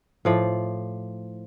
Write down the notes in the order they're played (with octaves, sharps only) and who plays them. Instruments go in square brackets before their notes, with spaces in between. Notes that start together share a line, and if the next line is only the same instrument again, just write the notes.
[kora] A2 F3 D5